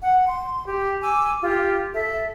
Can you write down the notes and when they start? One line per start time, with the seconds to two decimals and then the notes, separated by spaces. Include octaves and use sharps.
0.02 F#5
0.27 C6
0.66 G4
1.02 G#5 D6 E6
1.42 F4 G4
1.94 A4 E5